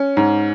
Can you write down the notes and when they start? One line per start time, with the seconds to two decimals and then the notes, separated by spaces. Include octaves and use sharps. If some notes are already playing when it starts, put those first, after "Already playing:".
Already playing: C#4
0.17 G#2